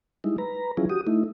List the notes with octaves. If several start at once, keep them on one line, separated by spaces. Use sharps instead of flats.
G3 G#3 D#4 E4
B4 A#5
F3 F#3 C#4 E4 F4 G#4
F#4 G4 D#6
A3 D#4 E4